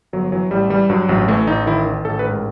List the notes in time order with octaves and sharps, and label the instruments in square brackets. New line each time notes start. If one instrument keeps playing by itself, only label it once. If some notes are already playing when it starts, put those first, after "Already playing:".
[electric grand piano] G1 F#3
E3 F#3
A1 G3
E3 G3
G2 F#3
A1 F#3
E3 A3
A1 D#4
D#3 E4
D#3
A1 A4
B4
G#2 A#4